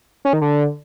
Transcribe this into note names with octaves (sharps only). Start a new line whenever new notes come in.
C#4
D#3
D3